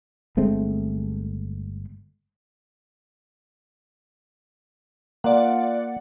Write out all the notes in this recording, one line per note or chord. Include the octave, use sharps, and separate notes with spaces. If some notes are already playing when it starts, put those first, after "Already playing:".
G1 G#3 A3 C4
A#3 F4 D5 F#5